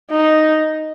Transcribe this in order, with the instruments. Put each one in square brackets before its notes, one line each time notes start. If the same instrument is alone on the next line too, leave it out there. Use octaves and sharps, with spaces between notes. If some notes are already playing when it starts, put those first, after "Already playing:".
[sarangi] D#4